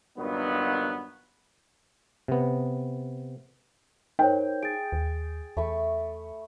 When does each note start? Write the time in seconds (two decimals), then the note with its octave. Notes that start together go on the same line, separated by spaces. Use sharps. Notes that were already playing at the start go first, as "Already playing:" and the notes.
0.18 G2 A#2 D#3 F#3 B3
2.28 C3 B3
4.19 D#4 A#4 C5 C#5 G5
4.63 G#4 A6 D7
4.92 D#2
5.57 E2 A3 B5 C#6